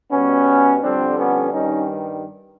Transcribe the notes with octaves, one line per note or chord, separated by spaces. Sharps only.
B2 G3 B3 C#4
F2 D3 G3 C4 D4
B3 C#4
G2 D#3 G3 C#4 D#4